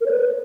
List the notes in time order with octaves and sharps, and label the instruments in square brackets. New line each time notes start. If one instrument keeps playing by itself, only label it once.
[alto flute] A#4
C#5
B4